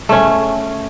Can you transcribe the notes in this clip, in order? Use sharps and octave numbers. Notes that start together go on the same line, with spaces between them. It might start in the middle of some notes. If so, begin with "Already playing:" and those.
A3 C#4